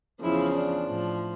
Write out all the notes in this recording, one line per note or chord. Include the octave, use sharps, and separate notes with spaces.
E2 C#3 F3 E4
D4
A2 F3